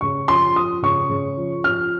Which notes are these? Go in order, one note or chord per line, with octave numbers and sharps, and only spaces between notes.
C#3 C#6
F3 C6
F3 D#6
C#3 C#6
C#3
F3
F3 F6